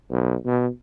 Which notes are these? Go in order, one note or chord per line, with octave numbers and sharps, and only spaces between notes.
B1
B2